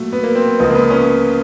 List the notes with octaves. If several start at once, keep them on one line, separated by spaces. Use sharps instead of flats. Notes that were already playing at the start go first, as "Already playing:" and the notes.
Already playing: A#2 F#3 A3
B3
A#3
C4
B3
C#2 C#3 F3 G#3 B3
A#3
B3
C#4